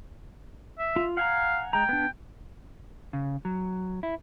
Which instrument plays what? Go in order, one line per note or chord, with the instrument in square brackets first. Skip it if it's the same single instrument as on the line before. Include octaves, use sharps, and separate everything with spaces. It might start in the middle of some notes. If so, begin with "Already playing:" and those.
[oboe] E5
[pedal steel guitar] F4
[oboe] F5 [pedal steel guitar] F#5 G#5 A#5
[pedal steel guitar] G#3 A#5 [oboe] G5
[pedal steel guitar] B3 D4
[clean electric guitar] C#3
F#3
E4